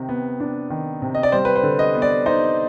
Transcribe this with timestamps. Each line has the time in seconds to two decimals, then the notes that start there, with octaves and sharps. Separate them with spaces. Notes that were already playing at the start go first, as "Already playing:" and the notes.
Already playing: C3 D#3
0.09 B3
0.40 D4
0.70 D#3
1.02 C3
1.15 D#5
1.23 D5
1.32 G3 C5
1.45 B4
1.56 C5
1.63 D3
1.79 D#5
1.95 B3
2.02 D5
2.26 D#4 C5